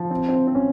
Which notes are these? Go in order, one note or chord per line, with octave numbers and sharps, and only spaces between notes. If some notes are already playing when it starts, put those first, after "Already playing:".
Already playing: F3
C4
C4
C4
C#4